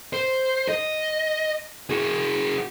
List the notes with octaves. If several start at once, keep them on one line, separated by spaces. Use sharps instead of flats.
C5
D#5
F#4 G#4